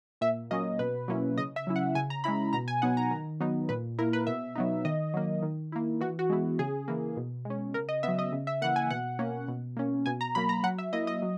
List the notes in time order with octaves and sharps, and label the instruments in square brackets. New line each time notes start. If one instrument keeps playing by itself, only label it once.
[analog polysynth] A#2 E5
F#3 A#3 C#4 D#5
B2 B4
F#3 A#3 C#4 E4
C#3 D#5
E5
F#3 C#4 E4
F#5
C#3 G#5
A#5
G#3 C#4 E4 B5
B2 A#5
G#5
F#3 B3 D#4 F#5
A#5
D#3
F#3 B3 D#4
A#2 B4
A#3 E4 A#4
B4
B2 E5
F#3 B3 D#4
D#3 D#5
F#3 A#3
D#3
A#3 E4
E3 F#4
F#4
G#3 B3 E4
C#3 G#4
E3 A#3
B2
G#3
C#4
C#3 A#4
D#5
F#3 B3 E5
D#5
C#3
E5
E3 A#3 F#5
G#5
B2 F#5
A#3 C#4
B2
A#3 C#4
B2 G#5
A#5
F#3 A#3 B5
A#5
F#3 F#5
E5
A#3 E4 D#5
D#5
F#3